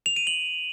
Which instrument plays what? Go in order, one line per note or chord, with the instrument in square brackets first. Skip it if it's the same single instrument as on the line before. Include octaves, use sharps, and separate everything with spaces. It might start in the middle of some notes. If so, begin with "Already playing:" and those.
[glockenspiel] F7
D#7
F#7